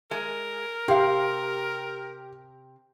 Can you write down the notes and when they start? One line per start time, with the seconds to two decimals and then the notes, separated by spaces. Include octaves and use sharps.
0.11 G#3 A#4
0.88 C3 G4 F5